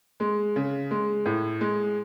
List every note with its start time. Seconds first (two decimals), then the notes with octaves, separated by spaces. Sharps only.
0.20 G#3
0.56 C#3
0.91 G#3
1.26 A2
1.61 G#3